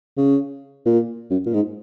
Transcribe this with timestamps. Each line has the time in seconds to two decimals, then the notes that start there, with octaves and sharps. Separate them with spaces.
0.17 C#3
0.85 A#2
1.30 F#2
1.46 A#2
1.54 G#2